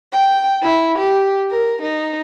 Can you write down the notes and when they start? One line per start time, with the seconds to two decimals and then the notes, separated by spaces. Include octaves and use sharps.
0.13 G5
0.63 E4
0.99 G4
1.51 A#4
1.82 D#4